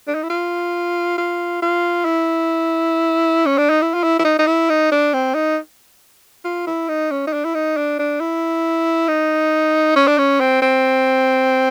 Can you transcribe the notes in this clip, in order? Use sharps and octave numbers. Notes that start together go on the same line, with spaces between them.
D4
D#4
E4
F4
F4
F4
E4
C#4
D4
D#4
E4
F4
E4
E4
D#4
D#4
E4
D#4
D4
C4
D#4
F4
E4
D#4
C#4
D#4
D4
E4
D#4
D4
D4
E4
D#4
C#4
D4
C#4
C4
C4